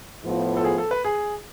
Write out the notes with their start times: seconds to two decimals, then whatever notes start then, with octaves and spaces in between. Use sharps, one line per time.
0.24 A2 F3 B3 F4
0.57 A4
0.64 G#4
0.78 A4
0.91 B4
1.05 G#4